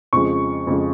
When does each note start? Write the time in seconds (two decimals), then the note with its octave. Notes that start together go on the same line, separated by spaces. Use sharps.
0.13 F2 C#3 F3 G#3 C#6
0.67 F2 C#3 F3 G#3